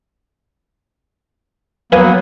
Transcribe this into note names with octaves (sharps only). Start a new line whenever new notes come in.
F#3 A#3 B3 B4 F5 G#5